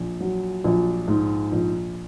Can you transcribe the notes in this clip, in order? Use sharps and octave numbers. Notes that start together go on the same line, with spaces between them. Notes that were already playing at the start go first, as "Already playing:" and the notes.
Already playing: A#1
F#3
A#1
G#2
A#1